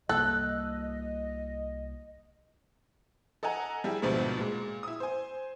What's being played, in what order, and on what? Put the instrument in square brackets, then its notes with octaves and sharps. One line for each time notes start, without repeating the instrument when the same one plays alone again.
[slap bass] C2 A#3 [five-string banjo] A4 [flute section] D#5 [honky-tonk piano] F#6
[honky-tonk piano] A4 D#5 F#5 G#5 A#5
G3 E4 G4 G#4
D2 G#2 B2 F3 G3 A3
A#2 G#3
E4 D#6
C5 G#5